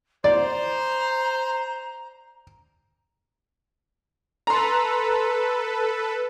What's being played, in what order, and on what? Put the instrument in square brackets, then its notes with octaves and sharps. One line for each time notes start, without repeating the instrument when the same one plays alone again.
[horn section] C5 [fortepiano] D5 [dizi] A#5
[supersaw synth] A4 B4 [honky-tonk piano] A#5 C6